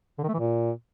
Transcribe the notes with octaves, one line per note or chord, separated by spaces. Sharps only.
D3
D#3
A3
E3
A#2